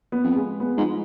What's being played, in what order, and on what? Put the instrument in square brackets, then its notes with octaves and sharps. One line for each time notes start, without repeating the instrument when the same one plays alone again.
[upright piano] B3
[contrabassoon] F2
[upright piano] G#3
B3
[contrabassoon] G#2 [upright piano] F3